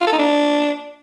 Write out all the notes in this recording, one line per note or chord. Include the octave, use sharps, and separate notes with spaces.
F4
A4
D#4
D4